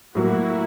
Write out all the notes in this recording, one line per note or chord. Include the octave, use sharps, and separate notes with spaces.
A2 F#3 A#3 E4 F#4